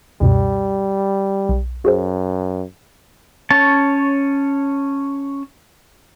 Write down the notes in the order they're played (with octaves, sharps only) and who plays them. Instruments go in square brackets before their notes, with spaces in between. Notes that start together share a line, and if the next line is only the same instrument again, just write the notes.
[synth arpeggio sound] C#2 F#2 B2 [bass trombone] G3
[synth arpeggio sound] B1
[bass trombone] F#2 [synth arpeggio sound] F#4 G#4 C5
[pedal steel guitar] C#4 C#5 A5